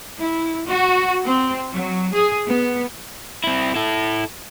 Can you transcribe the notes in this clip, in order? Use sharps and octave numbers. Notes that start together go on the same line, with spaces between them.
E4
F#4
C4
F#3
G#4
B3
C4 E4
E4 A4